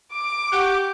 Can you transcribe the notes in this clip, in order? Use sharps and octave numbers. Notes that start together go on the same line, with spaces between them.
D6 D7
G4 F#5 C#6 F#6